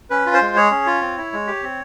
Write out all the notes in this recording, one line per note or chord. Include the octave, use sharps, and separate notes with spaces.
C#4 B4
F4
C5
G#3
G#4 C#5
C#4
F4
C4
E4
G#3
G4
C4